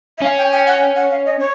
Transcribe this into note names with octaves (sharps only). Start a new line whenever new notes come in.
E5
C#4 F5
G5
G5
F#5
G5
F#5
F5
D#5
C#5